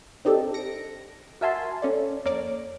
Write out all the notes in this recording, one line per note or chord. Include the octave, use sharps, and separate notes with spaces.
C4 D4 D#4 G4 A4
A#6 C#7 D7
F#4 A#4 E5 G#5 A5 C6
C#4 A4 D5
F2 A#3 C#5 D5